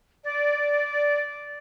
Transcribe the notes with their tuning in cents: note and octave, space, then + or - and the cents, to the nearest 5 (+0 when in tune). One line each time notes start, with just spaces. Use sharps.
D5 -10